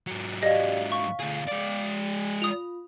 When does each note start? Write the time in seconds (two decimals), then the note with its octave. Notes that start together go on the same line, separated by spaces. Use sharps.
0.07 G#2 F#3
0.43 G4 D5 D#5 F5
0.92 F5 C#6
1.20 D2 G#4
1.48 G#3 D5
2.42 F4 D#6 F7